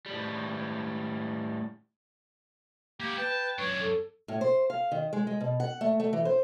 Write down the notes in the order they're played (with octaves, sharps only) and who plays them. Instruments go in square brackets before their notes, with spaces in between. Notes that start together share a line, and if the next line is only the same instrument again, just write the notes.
[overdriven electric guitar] A2 G3
[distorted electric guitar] A#3 B3 [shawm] G4
[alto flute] B4 [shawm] G5 [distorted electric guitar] A5
[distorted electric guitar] F#2 D4 [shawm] C#5
[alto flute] A4
[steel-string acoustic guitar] A2
C5
F5
D#3
G#3
G#3
B2
F#5
A3
A3
E3
C5